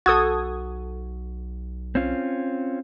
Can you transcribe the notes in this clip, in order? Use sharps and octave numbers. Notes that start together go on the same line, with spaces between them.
B1 F#4 A4 D#6 G#6
C4 C#4 F4